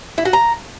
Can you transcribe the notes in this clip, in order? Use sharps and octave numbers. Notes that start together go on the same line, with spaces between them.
E4
F#4
A#5